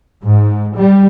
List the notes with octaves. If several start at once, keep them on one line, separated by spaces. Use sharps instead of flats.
G#2
G3